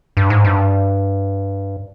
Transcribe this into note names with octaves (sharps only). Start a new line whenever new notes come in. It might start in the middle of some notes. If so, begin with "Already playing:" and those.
G2
G#2
G2